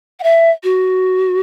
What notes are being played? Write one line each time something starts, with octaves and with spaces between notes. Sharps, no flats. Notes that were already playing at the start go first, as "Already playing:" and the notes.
F#5
E5
F#4